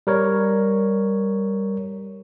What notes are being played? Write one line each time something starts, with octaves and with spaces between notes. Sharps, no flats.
G3 A#4 C#5